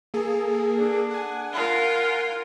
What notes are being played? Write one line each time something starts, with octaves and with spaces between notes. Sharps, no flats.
A#3 G#4 A4
D4
F#5 G#5
F4 A#4